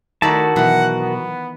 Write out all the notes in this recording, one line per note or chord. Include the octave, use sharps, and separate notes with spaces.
D#3 A3 D#4 E4 F#4 A#4 D5 A5
B2 D#3 E3 F#3 F#5
B3